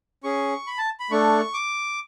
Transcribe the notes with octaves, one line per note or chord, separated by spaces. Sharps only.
C#4 G#4 C#6
B5
A5
B5
A3 D4 A4 C#6
D6